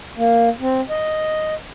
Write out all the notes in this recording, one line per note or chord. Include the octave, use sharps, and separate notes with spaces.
A#3
C4
D#5